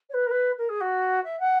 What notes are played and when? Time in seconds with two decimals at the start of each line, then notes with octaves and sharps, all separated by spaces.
0.09 C#5
0.13 B4
0.26 A#4
0.30 B4
0.57 A#4
0.69 G#4
0.80 F#4
1.24 E5
1.39 F#5